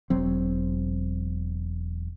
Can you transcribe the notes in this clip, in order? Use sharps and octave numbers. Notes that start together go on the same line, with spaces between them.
E1 F#3 C4